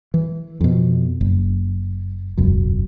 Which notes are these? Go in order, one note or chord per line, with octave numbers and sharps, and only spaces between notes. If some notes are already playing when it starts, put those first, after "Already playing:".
E3
F2 B2
F#1
E1 C#2 F#2